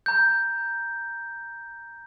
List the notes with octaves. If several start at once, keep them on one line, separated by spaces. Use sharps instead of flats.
A#5 G6